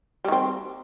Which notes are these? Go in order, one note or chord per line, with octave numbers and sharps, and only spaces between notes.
D#3 G3 C4